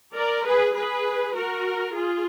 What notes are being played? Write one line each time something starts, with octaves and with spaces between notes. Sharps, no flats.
A#4 D5
G#4 B4
G#4 B4
F#4 A#4
F4 G#4